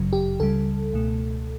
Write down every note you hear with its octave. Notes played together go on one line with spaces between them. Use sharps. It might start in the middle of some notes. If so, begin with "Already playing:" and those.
Already playing: G1 F#2 C#3 F#3
G4
C#2 C#3 G3 A4
C#2 B2 A3